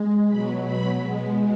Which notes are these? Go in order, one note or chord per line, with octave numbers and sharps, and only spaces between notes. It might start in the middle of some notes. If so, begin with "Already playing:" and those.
Already playing: G#3
B2 F#3 B5
B5
B2 G#3